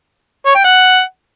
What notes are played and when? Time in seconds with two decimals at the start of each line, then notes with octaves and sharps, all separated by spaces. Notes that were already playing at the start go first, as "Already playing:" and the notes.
0.46 C#5
0.55 G5
0.64 F#5